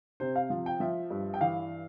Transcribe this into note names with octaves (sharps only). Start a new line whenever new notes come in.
C3 C5
F5
F3
G5
F3 E5
G2
G5
E3 F5